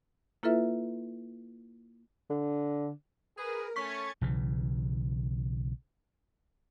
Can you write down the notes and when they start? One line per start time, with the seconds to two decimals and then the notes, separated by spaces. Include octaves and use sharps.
0.43 A#3 E4 F4 A4 B4 E5
2.30 D3
3.38 G#4 A#4 B4
3.76 A3 C#4 C#6 G#6 A6 B6 C#7
4.21 B1 C#3 E3